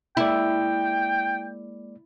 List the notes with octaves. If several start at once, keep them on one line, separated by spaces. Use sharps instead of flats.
G#3 A#3 E4 D5 G5